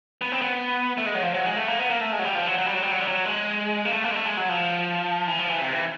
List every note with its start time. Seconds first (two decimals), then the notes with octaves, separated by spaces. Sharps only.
0.22 B3
0.32 C4
0.42 B3
0.98 A3
1.06 G#3
1.15 F#3
1.22 F3
1.34 F#3
1.45 G#3
1.56 A3
1.68 A#3
1.79 B3
1.90 A#3
2.01 A3
2.12 G#3
2.19 F#3
2.24 G3
2.35 F3
2.47 F#3
2.58 F#3
2.66 G3
2.74 F#3
2.82 G3
2.91 F#3
3.00 G3
3.08 F#3
3.25 G#3
3.85 A#3
3.92 A3
4.04 A#3
4.11 G#3
4.15 A3
4.26 G#3
4.37 F#3
4.49 F3
5.28 E3
5.39 F3
5.50 E3
5.61 C3
5.73 E3